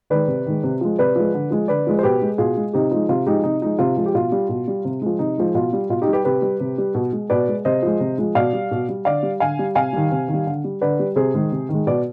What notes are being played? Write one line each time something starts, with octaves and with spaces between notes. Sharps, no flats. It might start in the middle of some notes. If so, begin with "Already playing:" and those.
D#3 G#3 B4 D5
C3
D#3 G#3
C3
F3 G#3
C3 B4 D5
F3 G#3
D3
F3 G#3
D3 B4 D5
F3 G#3
C5
B2 G4 B4
G#3
B2 F4 G#4
G#3
C3 D#4 G4
F3 G#3 D#4
C3 F4
F3 G#3 D#4 G4
C3 D#4
F3 G#3 D#4
C3 F4
F3 G#3
G4
B2 F4
G3
B2
G3
C3
F3 G#3
C3 D#4
F3 G#3
B2 F4
G3
B2 F4
D#4 G4
G3
G4 B4
C3 G4 B4
G3
C3
G3
B2
G#3
B2 B4 D5
G#3
C3 C5 D#5
F3 G#3
C3
F3 G#3
B2 D5 F5
G3
B2
G3
D3 D5 F5
G3
D3 F5 G#5
G3
C3 F5 G#5
D#3 G3
C3
D#3
G3
D3
G3
D3 B4 D5
G3
C3 G#4 C5
D#3 G#3
C3
D#3 G#3
B2 B4 D5